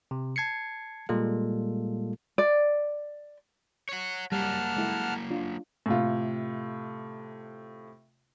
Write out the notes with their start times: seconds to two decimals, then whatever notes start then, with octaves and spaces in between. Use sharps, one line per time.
0.11 C3
0.36 A5 G#6 C7 C#7
1.09 A#2 G3 G#3 A#3 F4 A4
2.38 D5
3.89 C#5 F#5
4.32 F#3 G3 A#3 F#5 A5 F6
4.77 G#3 E4 A4
5.30 D4 F4
5.86 A2 C3 F4